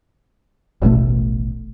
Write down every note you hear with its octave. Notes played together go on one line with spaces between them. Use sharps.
D#1 A1 B2 A3